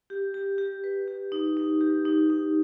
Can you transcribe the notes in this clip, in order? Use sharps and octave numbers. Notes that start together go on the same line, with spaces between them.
G4
G4
G4
B4
G4
D#4
D#4
G4
D#4
D#4